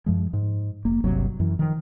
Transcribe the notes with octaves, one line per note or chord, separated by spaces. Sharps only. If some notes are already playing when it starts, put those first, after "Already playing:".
F#2 F3 G#3
G#2
F1 A#3
D1 G1 C3 F#3
F#2 E3
D#3 F3